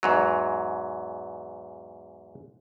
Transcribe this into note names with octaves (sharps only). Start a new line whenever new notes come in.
E2 G#2 F#3